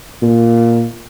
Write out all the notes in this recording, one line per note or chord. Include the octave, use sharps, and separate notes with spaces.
A#2